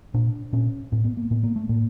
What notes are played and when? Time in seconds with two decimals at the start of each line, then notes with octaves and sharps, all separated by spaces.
0.14 A#2 D4
0.53 A#2 C#4
0.92 A2 C4
1.04 B3
1.17 A#3
1.31 A2 B3
1.43 A#3
1.56 A3
1.69 A2 A#3